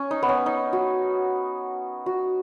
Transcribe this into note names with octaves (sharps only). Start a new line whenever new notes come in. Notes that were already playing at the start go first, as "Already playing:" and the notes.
Already playing: C#4
D#4
B3
C#4
D#4
F#4
F#4